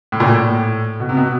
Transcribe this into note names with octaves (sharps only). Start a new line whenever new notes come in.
A2
A#2
A2
B2
C3
B2